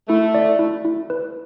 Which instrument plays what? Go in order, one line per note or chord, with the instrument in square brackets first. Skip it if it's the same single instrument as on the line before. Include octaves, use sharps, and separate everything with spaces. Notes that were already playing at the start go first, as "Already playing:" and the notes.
[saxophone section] A3 [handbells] E4
[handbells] D5
E4
E4
B4